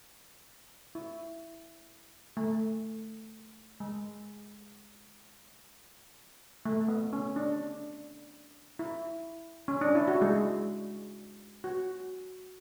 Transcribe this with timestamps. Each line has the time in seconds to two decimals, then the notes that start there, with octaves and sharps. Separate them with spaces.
0.95 E4
2.37 A3
3.80 G#3
6.65 A3
6.88 B3
7.13 C#4
7.36 D4
8.79 E4
9.68 C#4
9.81 D4
9.95 E4
10.08 F#4
10.21 G#3 G#4
11.64 F#4